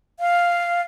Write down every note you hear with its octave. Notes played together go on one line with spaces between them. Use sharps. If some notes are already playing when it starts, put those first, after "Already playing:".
F5